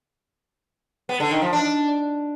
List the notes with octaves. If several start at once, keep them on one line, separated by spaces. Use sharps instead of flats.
B3
D3
D#3
F3
D4